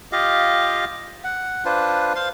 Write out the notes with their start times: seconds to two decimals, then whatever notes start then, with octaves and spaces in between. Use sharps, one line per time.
0.12 F4 G4 D#5 F5
1.24 F#5
1.65 D4 F4 B4 C5
2.15 C5 F5 C6